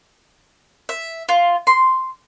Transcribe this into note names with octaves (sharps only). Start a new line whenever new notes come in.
E5
F4
C6